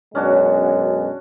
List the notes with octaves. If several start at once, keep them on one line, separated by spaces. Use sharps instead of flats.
F#2 B2 G#3 C#4 D4 F#4